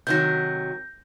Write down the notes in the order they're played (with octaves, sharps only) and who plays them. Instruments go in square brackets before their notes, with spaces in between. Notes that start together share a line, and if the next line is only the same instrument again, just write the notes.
[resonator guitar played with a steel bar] C3 D#3 F#3 [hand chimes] G6 A#6